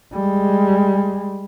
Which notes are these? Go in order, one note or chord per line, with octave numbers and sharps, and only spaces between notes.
G3 G#3